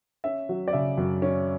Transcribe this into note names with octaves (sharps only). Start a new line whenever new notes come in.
C#4 E5
F#3
D5
C#3 E5
F#2
C#4